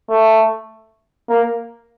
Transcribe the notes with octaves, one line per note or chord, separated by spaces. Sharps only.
A3
A#3